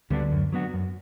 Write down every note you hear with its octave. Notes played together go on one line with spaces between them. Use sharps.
D2 D3 G3 B3 D4
F#2
F#3 B3 D4 F#4
F#2